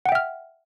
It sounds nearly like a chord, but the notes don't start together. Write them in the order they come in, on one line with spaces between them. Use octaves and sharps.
F#5 G5 E5 F6